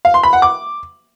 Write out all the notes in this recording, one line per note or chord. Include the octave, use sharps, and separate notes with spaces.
F5
C6
B5
F#5
D6